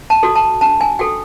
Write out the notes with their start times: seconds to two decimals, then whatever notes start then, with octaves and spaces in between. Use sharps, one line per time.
0.10 A5
0.23 F#4 A4
0.35 A5
0.61 D4 A5
0.81 G#5
0.99 F#4 A4 G5